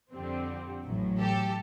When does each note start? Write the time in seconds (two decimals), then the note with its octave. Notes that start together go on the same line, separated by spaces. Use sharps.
0.13 F2 D3 G3 C4
0.83 A1 A2 F#3
1.19 G4 A4